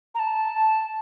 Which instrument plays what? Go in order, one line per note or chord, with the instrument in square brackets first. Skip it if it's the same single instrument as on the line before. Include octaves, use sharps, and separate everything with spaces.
[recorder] A#5
A5